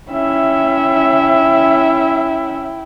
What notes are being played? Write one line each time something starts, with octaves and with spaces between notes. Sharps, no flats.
C#4 E4 E5 G5